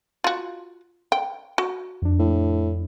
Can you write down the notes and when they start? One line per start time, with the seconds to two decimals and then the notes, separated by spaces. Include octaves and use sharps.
0.24 F4 F#4
1.12 G5
1.58 F#4
2.02 F2 D4
2.19 A2